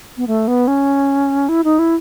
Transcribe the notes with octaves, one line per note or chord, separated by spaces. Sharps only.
B3
A3
B3
C#4
E4
D#4
E4